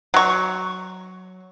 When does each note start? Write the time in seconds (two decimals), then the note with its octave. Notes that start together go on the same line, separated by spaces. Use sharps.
0.14 F#3 C#6